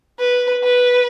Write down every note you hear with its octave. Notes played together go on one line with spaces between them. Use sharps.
B4
B4